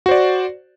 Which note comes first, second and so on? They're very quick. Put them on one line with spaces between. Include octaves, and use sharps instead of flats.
F#4 C5 D5